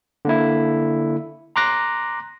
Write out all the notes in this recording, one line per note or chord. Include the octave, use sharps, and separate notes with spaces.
D3 A#3 E4
A#5 C6 D6 F#6 A#6